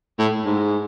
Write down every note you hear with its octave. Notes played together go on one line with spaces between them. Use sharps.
A2
G#2